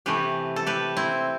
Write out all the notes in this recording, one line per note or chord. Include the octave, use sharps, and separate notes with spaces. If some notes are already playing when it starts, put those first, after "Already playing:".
C3 E3 A3 G4 B4
A4
G4 B4
C4 E4